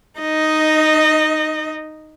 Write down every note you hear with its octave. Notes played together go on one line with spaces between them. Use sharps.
D#4 D#5